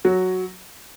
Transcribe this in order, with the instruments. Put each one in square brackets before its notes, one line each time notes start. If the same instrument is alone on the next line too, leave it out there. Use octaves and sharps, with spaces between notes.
[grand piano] F#3 F#4